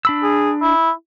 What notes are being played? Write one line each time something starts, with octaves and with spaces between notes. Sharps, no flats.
D4 B5 E6
G#4
E4